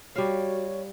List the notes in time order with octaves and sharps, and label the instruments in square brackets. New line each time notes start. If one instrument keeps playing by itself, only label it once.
[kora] G3 F5 [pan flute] F#4 [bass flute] C#5